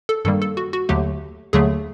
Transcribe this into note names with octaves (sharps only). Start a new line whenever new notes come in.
A4
G2 D#3 G3 A#3 A4
A4
F#4
F#4
D#2 D3 F#3 A3 G4
D#2 D3 F#3 A3 G#4